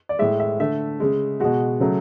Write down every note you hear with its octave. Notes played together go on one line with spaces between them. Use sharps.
D5
A2 G#3 E5
E5
D3 A3 E5
C#3 G#3
B2 G#3 F#4 F#5
C#3 F#3 A3